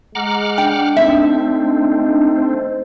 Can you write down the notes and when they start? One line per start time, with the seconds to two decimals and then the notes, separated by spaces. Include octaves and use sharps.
0.15 G#3 F#5 A#5 D6 F6
0.58 D4 G5
0.97 A3 C4 D#4 E5
2.37 C5